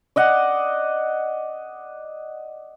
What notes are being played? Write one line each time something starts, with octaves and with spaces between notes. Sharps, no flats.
D5 D#5 F#5